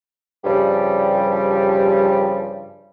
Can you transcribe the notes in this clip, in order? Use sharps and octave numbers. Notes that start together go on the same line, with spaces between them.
G2 C#3 F3 G3